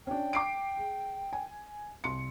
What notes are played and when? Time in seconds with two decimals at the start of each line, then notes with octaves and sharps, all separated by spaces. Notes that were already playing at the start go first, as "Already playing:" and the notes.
0.07 C#4 D4 G5
0.33 D6 C7 D7
0.77 G#4
1.33 G#5
2.04 C2 C6 C#7